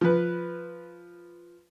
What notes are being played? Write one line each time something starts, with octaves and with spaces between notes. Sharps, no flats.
F3 B4